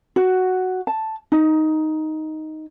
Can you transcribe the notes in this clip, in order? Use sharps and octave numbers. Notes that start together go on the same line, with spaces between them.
F#4
A5
D#4